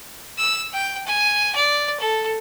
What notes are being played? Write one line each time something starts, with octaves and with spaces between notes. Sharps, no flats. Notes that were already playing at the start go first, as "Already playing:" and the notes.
E6
G5
G#5
D5
A4